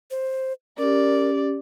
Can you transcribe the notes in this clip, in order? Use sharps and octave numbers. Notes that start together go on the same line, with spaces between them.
C5
C#4 G4 A#4 D5